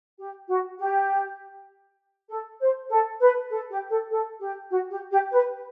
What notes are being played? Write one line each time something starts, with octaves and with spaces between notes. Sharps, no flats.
G4
F#4
G4
A4
C5
A4
B4
A4
G4
A4
A4
G4
F#4
G4
G4
B4